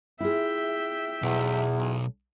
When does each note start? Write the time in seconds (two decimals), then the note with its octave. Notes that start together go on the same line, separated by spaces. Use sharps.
0.20 E4 F4 G#4 E5 G5
1.22 B1 E2